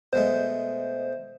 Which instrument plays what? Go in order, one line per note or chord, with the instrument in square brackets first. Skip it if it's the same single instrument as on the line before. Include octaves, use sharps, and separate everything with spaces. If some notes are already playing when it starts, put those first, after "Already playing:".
[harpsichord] B2 G#3 A3 [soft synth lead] C5